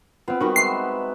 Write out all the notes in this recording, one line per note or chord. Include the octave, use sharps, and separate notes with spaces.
B3 C4 F4
D#3 G3 D#4 F#4 B4
G#3 E5 G5 C7